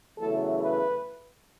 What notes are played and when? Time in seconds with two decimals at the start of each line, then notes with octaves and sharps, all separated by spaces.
0.18 E2 C#3 F#3 A3 E4 A4
0.59 B4